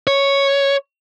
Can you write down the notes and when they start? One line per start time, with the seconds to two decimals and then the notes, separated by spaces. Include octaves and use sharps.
0.07 C#5